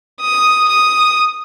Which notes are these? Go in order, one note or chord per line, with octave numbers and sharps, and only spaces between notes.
D#6
D#6